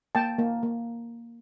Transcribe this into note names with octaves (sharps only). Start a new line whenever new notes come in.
A#3 G5 A5
A#3
A#3